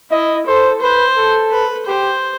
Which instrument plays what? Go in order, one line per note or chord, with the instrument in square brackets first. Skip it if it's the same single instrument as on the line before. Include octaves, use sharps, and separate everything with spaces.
[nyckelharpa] E4 [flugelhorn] D#5
[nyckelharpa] A4 [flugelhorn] C5
[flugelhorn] B4 [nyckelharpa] C5
[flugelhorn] A4
[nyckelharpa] B4
[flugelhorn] G4 [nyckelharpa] C5